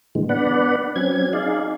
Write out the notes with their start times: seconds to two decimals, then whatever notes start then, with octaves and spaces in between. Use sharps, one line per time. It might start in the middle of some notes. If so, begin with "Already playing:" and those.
0.15 A#2 D3 E3 G#3
0.29 B3 D4 D5 F#5 B5
0.96 F#3 C4 C#4 G#6
1.33 D#4 G#4 D5 F5